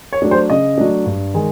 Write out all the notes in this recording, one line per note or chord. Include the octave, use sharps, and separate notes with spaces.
C#5
F#3 A3 D4
C5
C#3 D#5
F#3 A3 D4
G2
D#3 G#3